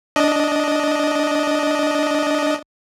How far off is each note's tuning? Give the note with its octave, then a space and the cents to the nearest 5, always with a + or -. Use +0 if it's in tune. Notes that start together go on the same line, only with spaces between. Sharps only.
D4 -5 D#5 +0